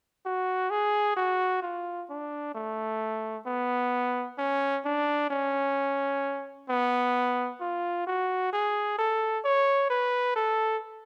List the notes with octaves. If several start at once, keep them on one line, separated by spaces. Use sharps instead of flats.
F#4
G#4
F#4
F4
D4
A3
B3
C#4
D4
C#4
B3
F4
F#4
G#4
A4
C#5
B4
A4